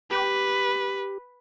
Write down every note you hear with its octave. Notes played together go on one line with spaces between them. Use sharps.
G4 B4